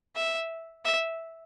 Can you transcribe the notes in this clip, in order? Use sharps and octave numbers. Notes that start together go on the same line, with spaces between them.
E5
E5